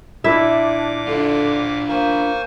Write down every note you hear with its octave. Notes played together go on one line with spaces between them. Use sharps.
A#2 D4 E4 E5 D6
D3 D4 F4
A#3 C5 G#5 C#6